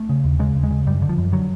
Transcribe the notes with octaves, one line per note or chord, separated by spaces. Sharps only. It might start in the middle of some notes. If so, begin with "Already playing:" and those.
Already playing: A3
C#3
D#2
C#3 G#3
D#2
G#3
C#3
F#2 G3
D3
F3
F#2
D3 F#3